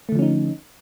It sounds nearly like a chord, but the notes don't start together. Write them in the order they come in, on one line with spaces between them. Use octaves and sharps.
A3 D3 F3 C#4 D#4